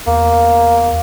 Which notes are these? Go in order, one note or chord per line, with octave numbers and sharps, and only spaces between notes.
E2 A#3